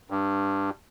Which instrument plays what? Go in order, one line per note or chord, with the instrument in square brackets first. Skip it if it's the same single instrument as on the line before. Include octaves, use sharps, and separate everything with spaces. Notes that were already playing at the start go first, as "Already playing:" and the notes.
[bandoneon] G2